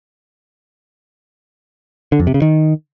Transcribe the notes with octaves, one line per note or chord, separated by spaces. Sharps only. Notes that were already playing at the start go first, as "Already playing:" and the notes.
D3
F2
C3
C#3
D#3